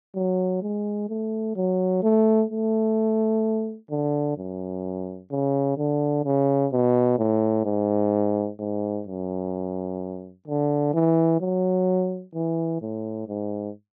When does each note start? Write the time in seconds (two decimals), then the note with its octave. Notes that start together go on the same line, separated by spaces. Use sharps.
0.15 F#3
0.62 G#3
1.09 A3
1.56 F#3
2.03 A3
2.50 A3
3.91 D3
4.38 F#2
5.31 C#3
5.78 D3
6.25 C#3
6.73 B2
7.19 A2
7.65 G#2
8.60 G#2
9.07 F#2
10.47 D3
10.94 E3
11.41 F#3
12.34 E3
12.81 A2
13.28 G#2